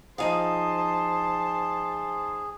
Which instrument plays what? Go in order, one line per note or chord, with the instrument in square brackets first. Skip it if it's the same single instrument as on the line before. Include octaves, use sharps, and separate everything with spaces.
[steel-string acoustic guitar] F3 D#4 F5 [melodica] G#4 [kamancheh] C5 A5